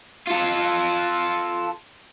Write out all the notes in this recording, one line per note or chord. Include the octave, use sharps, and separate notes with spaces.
F4 A4